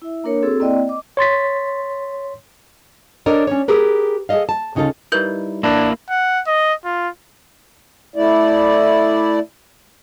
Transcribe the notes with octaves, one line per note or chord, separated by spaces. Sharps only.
E4 E5
A#3 D4 A#4 C#5
C4 F#4 G#4 A4 E6
A#3 C4 E4 D5 D#5 G5
D#5 D6
C#5 C6 A6 B6
D4 A4 A#4 C#5 D#5
C#4 D4 C#5
G4 G#4 A#4 B4
G#4 A4 C#5 D#5 F5
A5
D2 C#3 D#4 F4 A4
G3 D#4 E4 A#4 B4 G6
A1 A#3 D4 E4
F#5
D#5
F4
A3 E4 D5